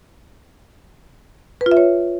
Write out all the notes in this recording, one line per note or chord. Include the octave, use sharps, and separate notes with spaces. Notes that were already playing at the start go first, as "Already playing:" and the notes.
B4
F4
E5
C#5